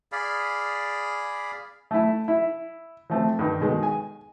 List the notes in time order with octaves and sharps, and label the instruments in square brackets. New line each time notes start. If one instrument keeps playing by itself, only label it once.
[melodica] G#4 D5 F5 B5
[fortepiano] A3 E4
E4
F3 A3 C4
G2 D#3
B2 D#3 G#3
G#5